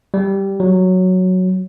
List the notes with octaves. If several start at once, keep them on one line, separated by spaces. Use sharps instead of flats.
G3
F#3